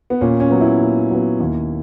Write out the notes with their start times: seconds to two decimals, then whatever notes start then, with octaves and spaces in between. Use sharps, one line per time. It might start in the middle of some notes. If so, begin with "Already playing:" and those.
0.10 B3
0.21 A#2 C#4
0.40 C#4
0.50 F#3 B3
0.61 E4
0.80 A#2
1.10 F#3 B3
1.40 D#2